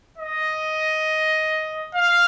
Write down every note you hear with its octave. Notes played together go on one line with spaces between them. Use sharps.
D#5
F5